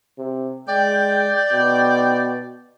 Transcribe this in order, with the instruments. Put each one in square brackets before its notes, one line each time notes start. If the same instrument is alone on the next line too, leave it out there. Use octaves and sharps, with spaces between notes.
[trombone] C3
[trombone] G#3 [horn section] D5 G5
[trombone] B2